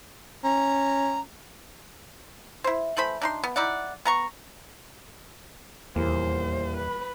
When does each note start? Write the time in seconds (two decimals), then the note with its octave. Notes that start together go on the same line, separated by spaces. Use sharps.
0.44 C#4 A#5
2.64 E4 C5
2.97 E3 A3 C5 B5
3.21 D4 D#4 C6
3.44 B3
3.56 D#4 E4 D5 F#5
4.05 B3 A#5 C#6
5.96 D#1 E2 E3 A#3 C5
6.78 B4 B5